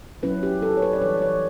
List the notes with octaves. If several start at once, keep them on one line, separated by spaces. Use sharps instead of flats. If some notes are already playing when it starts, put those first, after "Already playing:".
F#3 C#4 E4 B4
G4
A4
C#5
B4
D5
E3 G3 B3 D4 C#5
B4
C#5